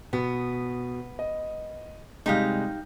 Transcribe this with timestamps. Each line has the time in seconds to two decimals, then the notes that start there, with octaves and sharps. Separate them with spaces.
0.13 B2 B3
1.19 D#5
2.26 C3 G3 G#3 D#4 G4 F5